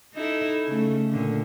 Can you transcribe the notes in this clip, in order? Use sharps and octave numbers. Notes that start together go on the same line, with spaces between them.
D#4 E4 A4
C#3 A3
A#2 D3